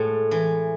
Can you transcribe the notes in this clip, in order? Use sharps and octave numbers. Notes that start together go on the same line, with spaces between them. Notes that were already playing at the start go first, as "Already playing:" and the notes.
Already playing: A2 G#3 A4
E3